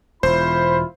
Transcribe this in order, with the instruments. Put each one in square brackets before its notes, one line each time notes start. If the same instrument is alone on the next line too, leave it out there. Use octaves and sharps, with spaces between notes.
[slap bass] E1 [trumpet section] E4 F4 B5 [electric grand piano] C5